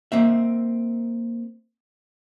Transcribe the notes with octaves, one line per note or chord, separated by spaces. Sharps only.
A#3 C4 E5